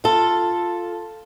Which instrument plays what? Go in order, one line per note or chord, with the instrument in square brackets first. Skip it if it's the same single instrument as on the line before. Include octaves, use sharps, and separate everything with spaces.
[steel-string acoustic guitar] F4 A4